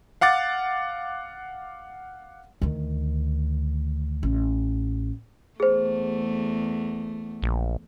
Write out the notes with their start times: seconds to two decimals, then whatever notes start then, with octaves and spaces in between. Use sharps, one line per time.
0.21 F5 F#5 D6 A6
2.62 D2 D#3
4.23 A1
5.60 E2 A3 G#4 C5
7.42 A#1